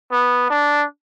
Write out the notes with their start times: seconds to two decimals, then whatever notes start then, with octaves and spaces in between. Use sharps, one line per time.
0.12 B3
0.50 D4